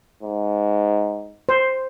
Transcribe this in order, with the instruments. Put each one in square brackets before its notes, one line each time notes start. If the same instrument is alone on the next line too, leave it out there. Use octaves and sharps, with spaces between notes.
[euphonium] G#2
[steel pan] C5